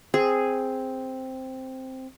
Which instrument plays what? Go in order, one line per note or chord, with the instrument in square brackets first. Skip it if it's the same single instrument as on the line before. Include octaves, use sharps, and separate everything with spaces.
[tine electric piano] C4 [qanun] G#4